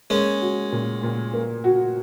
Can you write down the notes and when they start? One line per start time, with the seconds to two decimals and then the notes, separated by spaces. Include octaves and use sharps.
0.10 G#3 A#3 C#4
0.41 F#4
0.72 A#2
1.03 A#2
1.33 A#3
1.64 F#4